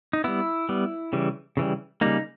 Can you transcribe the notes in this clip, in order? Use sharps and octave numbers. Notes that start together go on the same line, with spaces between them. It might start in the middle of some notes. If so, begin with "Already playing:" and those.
D#4
G3 B3 E4
G3 B3
C#3 E3 G3
C#3 E3 G3
C#3 G3 A#3 D#4